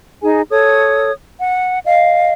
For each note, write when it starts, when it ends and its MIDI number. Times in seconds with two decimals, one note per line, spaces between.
0.22 0.41 63
0.22 0.41 68
0.22 0.41 80
0.50 1.11 69
0.50 1.11 73
0.50 1.11 87
1.38 1.78 78
1.84 2.33 75
1.84 2.33 77